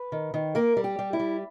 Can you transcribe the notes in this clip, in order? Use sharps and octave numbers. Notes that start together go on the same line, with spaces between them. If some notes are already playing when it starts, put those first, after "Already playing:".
Already playing: B4
D#3
D#3
A#3 A#4
G3
G4
G3
E4
G3